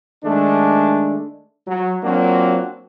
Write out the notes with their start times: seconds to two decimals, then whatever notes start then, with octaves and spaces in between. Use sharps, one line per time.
0.24 D#3 G#3 A3 D4
1.67 F#3
2.04 F#3 A#3 C4 D4 F4 F#4